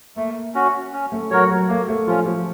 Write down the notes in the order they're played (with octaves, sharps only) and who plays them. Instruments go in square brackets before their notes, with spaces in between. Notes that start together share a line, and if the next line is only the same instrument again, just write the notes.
[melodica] A3 [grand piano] A#3
[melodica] C#4 F#4
C#4
[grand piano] A3
[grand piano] F#3 [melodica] F#4 A#4 C#5
[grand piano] F#3
[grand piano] A3 [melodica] A#3
[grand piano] A3
[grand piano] F3 [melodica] C#4 F4
[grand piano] F3